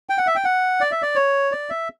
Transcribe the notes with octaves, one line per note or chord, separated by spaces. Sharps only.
G5
F#5
E5
G5
F#5
D5
E5
D5
C#5
D5
E5